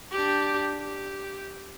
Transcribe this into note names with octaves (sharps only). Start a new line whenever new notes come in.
D4 G4
G4